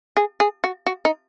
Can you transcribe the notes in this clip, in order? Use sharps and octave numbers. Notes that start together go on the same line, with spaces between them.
G#4
G#4
F#4
F#4
D#4